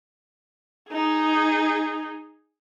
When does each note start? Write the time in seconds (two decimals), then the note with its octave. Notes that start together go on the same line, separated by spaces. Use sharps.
0.91 D#4 G#4